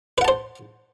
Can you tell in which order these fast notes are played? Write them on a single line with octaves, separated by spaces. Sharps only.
B4 F#5 A5 C5